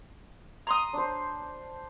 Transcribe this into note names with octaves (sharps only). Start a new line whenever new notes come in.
A#5 C6 D#6
D4 C5